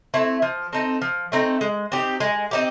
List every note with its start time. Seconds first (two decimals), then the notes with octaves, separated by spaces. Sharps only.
0.14 A3 C4 E4
0.42 F3
0.73 A3 C4 D#4
1.02 F3
1.32 A3 C4 D#4
1.61 G#3
1.92 C4 D#4 G4
2.20 G#3
2.51 C4 D#4 G4